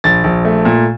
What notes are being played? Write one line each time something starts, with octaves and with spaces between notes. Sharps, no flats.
A#1 A6
A#1
A3
A#2